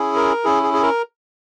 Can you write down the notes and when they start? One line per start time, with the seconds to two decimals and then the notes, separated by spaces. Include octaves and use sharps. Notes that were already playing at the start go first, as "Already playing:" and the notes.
Already playing: C#4 E4 G#4
0.15 A#4
0.44 C#4 E4 G#4
0.63 G#4
0.74 G#4
0.82 A#4